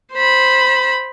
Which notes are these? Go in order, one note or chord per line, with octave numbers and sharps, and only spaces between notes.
C5 B5